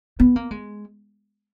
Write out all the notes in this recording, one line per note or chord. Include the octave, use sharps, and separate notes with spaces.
B3
A#3
G#3